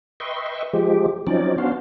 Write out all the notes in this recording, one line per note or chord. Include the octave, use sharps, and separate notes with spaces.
B4 D#5 E5 G5 C6 C#6
F3 G#3 G4
F3 F#3 C4 C#4 D#4 D5
B3 C#4 D4 F#4 C5 F5